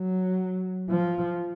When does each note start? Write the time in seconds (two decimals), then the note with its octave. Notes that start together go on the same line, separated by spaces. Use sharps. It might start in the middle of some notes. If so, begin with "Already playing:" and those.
Already playing: F#3
0.90 F3